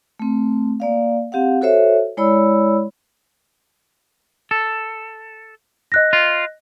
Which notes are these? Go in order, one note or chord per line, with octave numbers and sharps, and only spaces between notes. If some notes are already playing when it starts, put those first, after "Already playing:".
A3 C4
A#3 D5 F5
C4 G4 F5 F#5
F#4 A4 C5 C#5 E5
G#3 E4 C#5 D5 B5 E6
A4
D#5 F#6 A#6
F4